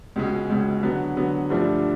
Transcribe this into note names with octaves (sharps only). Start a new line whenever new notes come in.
C#2 B2 G#3
C#2 B2 G#3
D3 F#3 B3
D3 F#3 B3
G2 D3 F3 A3 D4